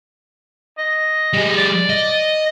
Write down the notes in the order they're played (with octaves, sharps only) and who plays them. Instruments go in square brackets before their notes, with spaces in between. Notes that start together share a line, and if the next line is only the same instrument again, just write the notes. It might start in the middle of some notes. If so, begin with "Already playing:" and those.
[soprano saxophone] D#5
[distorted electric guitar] G3 G#4
[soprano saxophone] D5
[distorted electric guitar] D#5